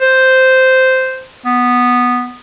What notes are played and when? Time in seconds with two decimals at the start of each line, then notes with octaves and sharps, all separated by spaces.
0.01 C5
1.45 B3